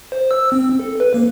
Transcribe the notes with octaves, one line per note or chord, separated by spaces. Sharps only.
C5
E6
C4
A4
B4
A#3